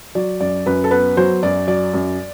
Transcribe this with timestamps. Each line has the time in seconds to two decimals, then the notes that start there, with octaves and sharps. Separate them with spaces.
0.15 F#3 D5
0.40 F#2 D5
0.66 F#2 B4
0.84 A4
0.91 B3 B4
1.17 F#3 C5
1.43 F#2 D5
1.68 F#3 D5
1.94 F#2